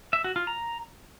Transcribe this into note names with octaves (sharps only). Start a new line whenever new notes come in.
E5
F#4
F4
A#5